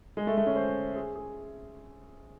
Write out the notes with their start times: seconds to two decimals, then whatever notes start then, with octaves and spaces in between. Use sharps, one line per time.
0.17 G#3
0.27 A3
0.37 A3
0.46 C#4
0.56 C5
0.96 G#4
1.16 G#4